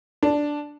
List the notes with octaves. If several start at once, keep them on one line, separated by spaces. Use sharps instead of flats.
D4